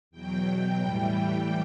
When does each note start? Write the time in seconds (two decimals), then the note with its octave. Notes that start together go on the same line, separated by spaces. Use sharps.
0.11 E2 B2 F#3 G5
0.79 A2 E3 G3